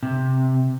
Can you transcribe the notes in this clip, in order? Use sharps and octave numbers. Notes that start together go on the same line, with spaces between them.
C3